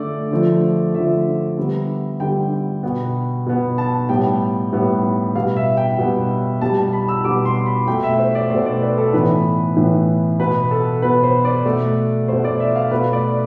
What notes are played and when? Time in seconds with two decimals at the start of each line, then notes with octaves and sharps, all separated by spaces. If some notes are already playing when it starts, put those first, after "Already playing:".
Already playing: D3 A3 D5
0.31 D3 F3 A3
0.94 D3 F3 A3 E5
1.57 D3 G3 B3
2.20 D3 G3 B3 G5
2.83 B2 B3
3.46 B2 B3
3.78 A5
4.09 A2 G3 B3 G5
4.72 A2 G3 B3
5.35 B2 G3 B3 F5
5.56 E5
5.77 G5
5.98 B2 G3 B3
6.61 B2 G3 B3 A5
6.77 A5
6.93 B5
7.08 E6
7.24 B2 G3 B3 D6
7.45 C6
7.66 B5
7.87 B2 A3 G5
8.03 E5
8.19 C5
8.35 D5
8.50 B2 A3 C5
8.66 D5
8.82 B4
8.98 A4
9.13 A2 E3 B3 B4
9.76 A2 E3 B3
10.40 B2 B3 B4
10.71 A4
11.02 B2 B3 B4
11.23 C5
11.45 D5
11.65 B2 A3
12.28 B2 A3 C5
12.44 D5
12.60 E5
12.76 F5
12.91 B2 A3 B4
13.13 D5